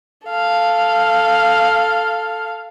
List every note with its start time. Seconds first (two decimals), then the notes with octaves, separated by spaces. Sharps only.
0.28 A4 F5